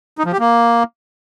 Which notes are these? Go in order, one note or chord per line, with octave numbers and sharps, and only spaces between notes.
D#4
F3
G4
A#3